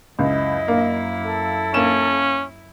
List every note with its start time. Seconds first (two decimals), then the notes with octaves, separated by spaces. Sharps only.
0.19 C#2 F#2 E4 D#5
0.68 A#3
1.23 A4
1.74 A#3 C#4 E7